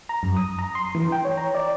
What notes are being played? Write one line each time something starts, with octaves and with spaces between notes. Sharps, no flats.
A#5
F#2
D#6
A#5
C6
E3
G5
C#5
A#5
D5